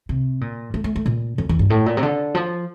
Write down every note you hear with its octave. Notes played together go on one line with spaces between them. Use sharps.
C3
A#2
A3
A3
A3
A#2
F2
E2
G2
A2
A#2
C3
D3
F3